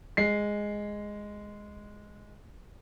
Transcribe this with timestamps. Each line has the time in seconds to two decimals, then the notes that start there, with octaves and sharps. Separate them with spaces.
0.17 G#3 C7